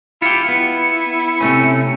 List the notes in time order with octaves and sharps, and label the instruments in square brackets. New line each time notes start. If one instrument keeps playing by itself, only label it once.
[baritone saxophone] E4 [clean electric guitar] F4 G4 [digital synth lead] C#7
[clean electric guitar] B3
C3 A3 C#4